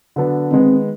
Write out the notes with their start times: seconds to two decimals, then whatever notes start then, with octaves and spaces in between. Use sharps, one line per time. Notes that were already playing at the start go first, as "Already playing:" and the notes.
0.16 D3 F#3 B3 D4
0.52 D#3 G#3 B3 C4